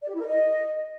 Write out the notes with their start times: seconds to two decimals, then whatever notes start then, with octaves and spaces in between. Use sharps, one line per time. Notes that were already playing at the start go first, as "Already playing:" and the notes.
0.01 D5
0.07 G4
0.13 E4
0.20 A#4
0.26 D#5